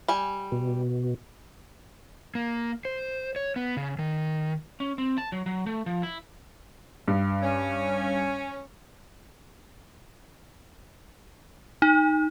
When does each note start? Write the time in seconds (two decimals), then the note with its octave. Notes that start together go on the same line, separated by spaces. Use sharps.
0.08 G3 G#5
0.52 B2
2.35 A#3
2.85 C5
3.36 C#5
3.56 B3
3.77 C#3
3.99 D#3
4.80 C#4
4.98 C4
5.18 A5
5.32 F#3
5.46 F#3
5.66 A3
5.86 F3
6.03 E4
7.08 G2
7.43 C#4
11.82 D#4